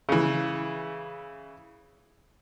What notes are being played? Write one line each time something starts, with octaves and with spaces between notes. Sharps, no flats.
C#3 E3